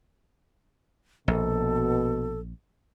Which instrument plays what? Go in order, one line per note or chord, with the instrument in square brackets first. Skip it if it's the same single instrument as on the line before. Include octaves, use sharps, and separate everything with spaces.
[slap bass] A#1 [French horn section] B2 [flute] A4